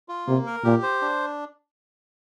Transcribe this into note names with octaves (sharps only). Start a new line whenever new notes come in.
F4
C3 A#3
A#4
A#2 G4
C5
D4